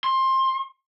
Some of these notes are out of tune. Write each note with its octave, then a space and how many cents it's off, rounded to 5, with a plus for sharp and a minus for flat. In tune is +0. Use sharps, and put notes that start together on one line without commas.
C6 +20